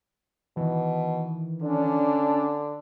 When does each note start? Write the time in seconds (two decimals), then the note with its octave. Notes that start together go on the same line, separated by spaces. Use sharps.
0.57 B2 D#3 E3
1.62 D3 C#4 D4